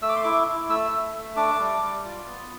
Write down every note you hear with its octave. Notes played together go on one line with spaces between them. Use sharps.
A3 E6
D6
C6
E4 D6
E4
A3 E6
A3
A3
D4 D6
G3
G3
F4
B3